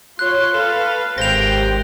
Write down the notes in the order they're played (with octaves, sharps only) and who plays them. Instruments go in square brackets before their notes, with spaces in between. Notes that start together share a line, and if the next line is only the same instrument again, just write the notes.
[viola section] F4 C#5 C6 [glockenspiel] F#6
[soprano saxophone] A4 [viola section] B4 F5
[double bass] G#1 [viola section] G4 G5 [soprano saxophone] C5 [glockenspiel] A#6 F7